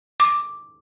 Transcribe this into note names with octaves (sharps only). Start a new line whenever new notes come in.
D6